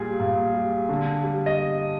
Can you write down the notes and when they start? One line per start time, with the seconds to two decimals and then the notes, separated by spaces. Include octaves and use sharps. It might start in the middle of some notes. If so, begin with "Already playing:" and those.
Already playing: A#2 G3 G#4
0.20 A#2
0.54 G3
0.89 D3
1.24 G3
1.46 D#5